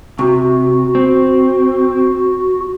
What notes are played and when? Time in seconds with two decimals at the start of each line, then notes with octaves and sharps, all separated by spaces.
0.19 C3 F#4
0.95 C4